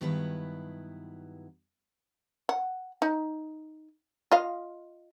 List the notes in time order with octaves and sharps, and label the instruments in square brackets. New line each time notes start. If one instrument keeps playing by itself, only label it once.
[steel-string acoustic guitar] G2 D#3 F#3 B3 E4 B4
[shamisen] F#5
D#4
F4 D#5 F5